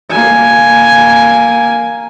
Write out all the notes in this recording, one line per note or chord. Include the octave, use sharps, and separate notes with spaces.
A#3 G#5